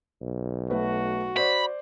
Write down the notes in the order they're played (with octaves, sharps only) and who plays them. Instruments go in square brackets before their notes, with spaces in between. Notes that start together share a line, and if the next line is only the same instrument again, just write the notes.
[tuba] B1
[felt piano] A3 B4 [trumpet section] F#4
[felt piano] C5 D5 [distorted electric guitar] B5